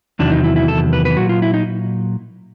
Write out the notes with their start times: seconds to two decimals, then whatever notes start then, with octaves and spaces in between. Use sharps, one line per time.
0.19 E2 C3 D#3 F#3 D4
0.31 D#4
0.44 E4
0.56 E4
0.68 A4
0.93 B4
1.05 B4
1.17 A#2 F#3 F#4
1.29 F4
1.42 E4
1.54 D#4